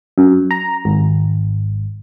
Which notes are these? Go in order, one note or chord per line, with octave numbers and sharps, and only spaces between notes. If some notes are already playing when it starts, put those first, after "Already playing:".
F#2
A#5
G#1